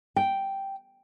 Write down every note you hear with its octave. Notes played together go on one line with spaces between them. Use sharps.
G5